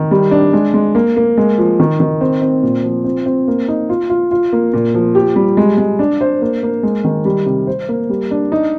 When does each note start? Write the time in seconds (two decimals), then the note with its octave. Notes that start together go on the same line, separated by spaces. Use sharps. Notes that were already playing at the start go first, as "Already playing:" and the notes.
Already playing: D#3
0.11 G3
0.31 D4
0.53 G#3
0.74 G#3
0.95 A#3
1.17 A#3
1.38 G#3
1.58 F3
1.80 D#3
2.00 D#3
2.21 C4
2.42 C4
2.63 A#2
2.84 F3
3.05 C4
3.26 C4
3.48 A#3
3.68 D#4
3.89 F4
4.10 F4
4.31 F4
4.53 A#3
4.74 A#2
4.94 F3
5.15 G4
5.36 G3
5.57 G#3
5.78 G#3
5.99 D4
6.21 C5
6.42 A#3
6.63 A#3
6.83 G#3
7.04 D#3
7.25 G3
7.46 C3
7.67 C5
7.89 A#3
8.09 G3
8.31 D4
8.52 D#4